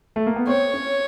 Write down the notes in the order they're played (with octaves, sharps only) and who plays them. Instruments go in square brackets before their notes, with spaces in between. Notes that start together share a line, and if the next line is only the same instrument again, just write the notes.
[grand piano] A3
A#3
B3
[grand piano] C4 [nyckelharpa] C#5
[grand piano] C#4